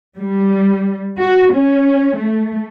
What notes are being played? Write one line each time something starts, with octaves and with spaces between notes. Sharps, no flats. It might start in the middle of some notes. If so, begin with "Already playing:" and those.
G3
F#4
C#4
A3